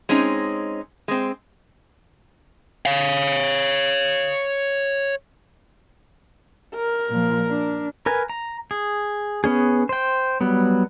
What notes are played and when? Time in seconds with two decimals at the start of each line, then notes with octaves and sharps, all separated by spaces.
0.09 G#3 C4 C#4 D#4
1.08 G#3 C4
2.86 C#5 F5
6.75 A#4
7.09 A#2 F3
7.49 D4
8.06 A#4 B4 G#5
8.30 A#5
8.71 G#4
9.44 B3 C#4 G#4
9.89 C5 G5
10.41 F#3 G3 B3